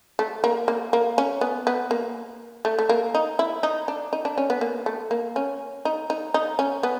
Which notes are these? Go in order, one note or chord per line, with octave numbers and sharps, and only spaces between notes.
A3
A#3
A#3
A#3
C#4
B3
B3
A#3
A3
A3
A#3
D#4
E4
D#4
D4
D#4
D4
C#4
B3
A#3
A3
A#3
C#4
D#4
D#4
D#4
C#4
B3